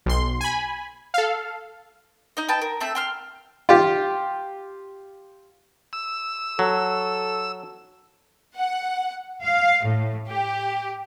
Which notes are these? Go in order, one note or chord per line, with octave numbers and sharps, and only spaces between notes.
B1 C6
G#5 B5
A4 F5
D#4 D#5
B4 D#5 G5 A5
A#4
A3 C4 E5
G5 C6 F6
F4 G4
E6
F#3 A4
F#5
F5
A2
G4